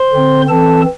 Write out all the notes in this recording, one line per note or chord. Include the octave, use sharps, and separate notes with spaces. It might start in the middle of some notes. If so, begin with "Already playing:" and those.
Already playing: C5 C6
D3 C4
E3 C4 A4 A5